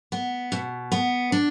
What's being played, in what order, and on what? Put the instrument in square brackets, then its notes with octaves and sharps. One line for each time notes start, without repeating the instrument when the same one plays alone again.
[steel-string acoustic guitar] B3
B2
B3
D4